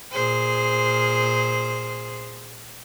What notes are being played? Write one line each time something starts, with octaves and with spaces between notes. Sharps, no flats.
A#2 G#4 C5